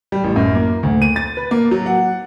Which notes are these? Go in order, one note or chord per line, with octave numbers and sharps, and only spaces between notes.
G3
A1
F#2
A#3
D2
D#7
A6
B4
A#3
F#3
F#5